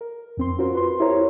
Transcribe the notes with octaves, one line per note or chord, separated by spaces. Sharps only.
A#4
F2 C4 C6
C#4 F4 F#4 A#4 C5
B4 C6
E4 G4 A#4 C5 C#5 A#5